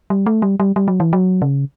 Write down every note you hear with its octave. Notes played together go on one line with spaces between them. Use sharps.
G3
A3
G3
G3
G3
F#3
E3
F#3
C#3